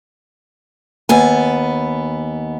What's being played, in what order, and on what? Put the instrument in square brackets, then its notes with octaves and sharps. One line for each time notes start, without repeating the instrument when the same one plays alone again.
[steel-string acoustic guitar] D#2 B3 G#5